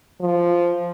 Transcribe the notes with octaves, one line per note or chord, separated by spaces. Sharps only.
F3